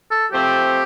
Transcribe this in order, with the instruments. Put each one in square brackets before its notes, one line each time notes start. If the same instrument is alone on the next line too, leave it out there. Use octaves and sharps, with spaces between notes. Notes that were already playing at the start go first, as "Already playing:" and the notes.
[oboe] A4
[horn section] F3 A3 C4 [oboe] G4